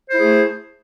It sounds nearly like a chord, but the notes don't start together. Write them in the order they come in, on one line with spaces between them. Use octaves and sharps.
C5 E4 G#4 A3